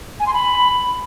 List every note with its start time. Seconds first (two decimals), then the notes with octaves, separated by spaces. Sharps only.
0.20 G#5
0.27 C6
0.33 B5